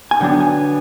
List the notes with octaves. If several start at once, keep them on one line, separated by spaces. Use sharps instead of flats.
G#5
D3 F#3 B3 D4 G5
G#5